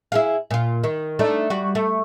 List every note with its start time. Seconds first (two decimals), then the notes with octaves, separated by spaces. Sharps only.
0.12 E4 G#4 F5
0.51 A#2 F4
0.84 D#3
1.19 A3 D4 D#4
1.50 G3 F#4
1.75 A3